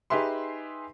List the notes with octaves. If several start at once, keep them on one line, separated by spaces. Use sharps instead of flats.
D#4 G4 G#4 B4 E5 C6